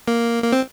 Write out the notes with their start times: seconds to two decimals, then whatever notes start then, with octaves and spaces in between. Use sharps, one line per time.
0.08 A#3
0.44 A#3
0.52 C4